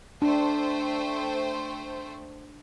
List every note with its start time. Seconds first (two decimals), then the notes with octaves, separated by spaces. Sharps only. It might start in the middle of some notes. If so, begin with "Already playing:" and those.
0.22 A3 D4 C5 G5